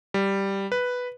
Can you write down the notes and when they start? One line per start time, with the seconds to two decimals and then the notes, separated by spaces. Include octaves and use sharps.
0.14 G3
0.72 B4